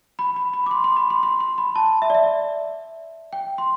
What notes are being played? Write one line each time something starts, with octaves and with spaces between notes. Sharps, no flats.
B5
B5
B5
D6
C6
C6
B5
C6
C6
C6
B5
A5
E5
D5
E5
G5
C6